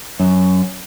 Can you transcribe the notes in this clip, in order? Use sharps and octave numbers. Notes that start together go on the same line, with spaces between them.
F#2